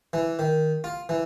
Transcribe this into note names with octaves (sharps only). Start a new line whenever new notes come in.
E3
D#3
F4
E3